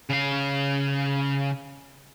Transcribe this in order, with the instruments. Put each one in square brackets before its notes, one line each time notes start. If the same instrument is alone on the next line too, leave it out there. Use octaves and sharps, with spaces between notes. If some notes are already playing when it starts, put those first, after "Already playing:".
[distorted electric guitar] C#3 F5